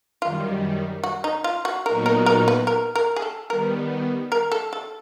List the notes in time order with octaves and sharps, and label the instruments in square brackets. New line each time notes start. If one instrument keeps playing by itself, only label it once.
[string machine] F#2 D#3 G3 [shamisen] F4
[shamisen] F#4
D#4
F4
F#4
[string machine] A#2 F#3 B3 D#4 F#4 [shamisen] A#4
[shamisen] A#4
A#4
B4
A#4
A#4
G#4
A4
[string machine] D#3 G3 B3 [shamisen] A#4
[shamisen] A#4
A4
A4